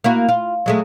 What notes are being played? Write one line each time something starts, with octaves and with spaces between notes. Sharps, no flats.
A#3 E4 F#4
F4
F#3 G#3 A3